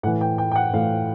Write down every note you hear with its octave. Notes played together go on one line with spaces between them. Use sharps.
A2 E3 F#5
G5
G5
G5
F#5
A2 E3 F5